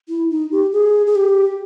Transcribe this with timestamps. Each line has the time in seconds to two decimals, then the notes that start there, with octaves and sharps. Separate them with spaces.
0.09 E4
0.30 D#4
0.52 G4
0.72 G#4
1.07 G#4
1.15 G4